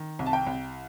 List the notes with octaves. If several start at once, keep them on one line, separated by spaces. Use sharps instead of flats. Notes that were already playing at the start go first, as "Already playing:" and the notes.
Already playing: D#3
C2
A5
G5
C2